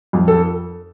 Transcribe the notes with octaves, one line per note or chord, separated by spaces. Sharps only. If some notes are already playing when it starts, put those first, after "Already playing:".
F2
A4